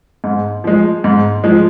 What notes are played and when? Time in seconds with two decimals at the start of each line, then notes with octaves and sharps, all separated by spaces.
0.24 G#2
0.64 F3 G#3
1.04 G#2
1.44 F3 G#3